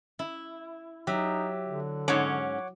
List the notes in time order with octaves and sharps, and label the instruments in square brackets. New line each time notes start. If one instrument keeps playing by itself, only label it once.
[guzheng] E4
[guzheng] F#3 [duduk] D#4 [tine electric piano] G4 E5
[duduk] D3
[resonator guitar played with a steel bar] G#2 C#4 [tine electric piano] C#5 F#5 D6